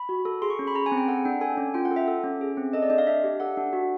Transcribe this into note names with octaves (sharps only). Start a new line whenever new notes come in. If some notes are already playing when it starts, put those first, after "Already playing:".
Already playing: B5
F#4
A4
G#4 C6
C#6
C#4
B5
G#4 A#5
G#5
C4
G5
A4 F#5
D4 G5
A4 G#5
C#4
F4 G5
F#5
A4
E5
A4
C#4
G#4
C4
A4 D#5
D5
D4 D#5
F5
D4 E5
G4
A4 F#5
D4
F#4